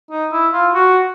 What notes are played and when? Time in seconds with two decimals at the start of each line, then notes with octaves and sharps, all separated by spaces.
0.10 D#4
0.32 E4
0.53 F4
0.74 F#4